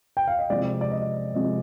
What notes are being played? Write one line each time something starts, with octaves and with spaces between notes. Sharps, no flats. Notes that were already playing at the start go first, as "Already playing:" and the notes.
G5
F5
D#5
C3 F3 G#3 D5
D5
D#5
C3 F3 G#3 D#5